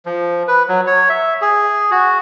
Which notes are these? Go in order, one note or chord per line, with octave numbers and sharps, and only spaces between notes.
F3
B4
F#3
C#5
E5
G#4
F#4